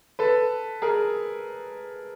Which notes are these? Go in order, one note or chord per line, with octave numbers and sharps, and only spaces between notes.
A4 B4
G#4 A#4